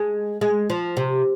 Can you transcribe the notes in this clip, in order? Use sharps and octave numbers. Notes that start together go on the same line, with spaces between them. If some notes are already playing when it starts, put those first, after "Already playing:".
Already playing: G#3
G#3
F3
C3